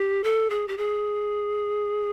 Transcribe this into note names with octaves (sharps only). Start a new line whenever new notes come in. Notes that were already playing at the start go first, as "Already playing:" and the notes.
Already playing: G4
A4
G#4
G4
G#4